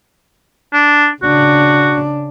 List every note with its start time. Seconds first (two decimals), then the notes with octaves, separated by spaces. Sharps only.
0.73 D4
1.22 C#3 D4 F#4